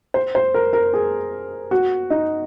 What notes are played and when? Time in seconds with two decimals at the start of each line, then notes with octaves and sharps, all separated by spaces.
0.14 C5
0.35 C5
0.54 A#4
0.73 A#4
0.93 G#4
1.71 F#4
2.10 D#4